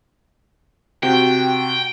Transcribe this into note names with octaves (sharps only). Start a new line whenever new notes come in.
C3 F#4 G5